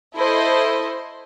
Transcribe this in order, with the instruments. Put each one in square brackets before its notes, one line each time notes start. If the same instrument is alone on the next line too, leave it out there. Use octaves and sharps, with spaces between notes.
[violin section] E4 A4 C5 D#5